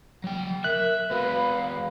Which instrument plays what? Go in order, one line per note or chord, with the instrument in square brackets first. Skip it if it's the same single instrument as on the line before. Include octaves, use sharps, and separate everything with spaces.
[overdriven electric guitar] F#3 G5
[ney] A#4 [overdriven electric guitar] E5 [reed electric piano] F#6
[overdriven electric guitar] G#3 F#4 [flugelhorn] B4 [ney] F5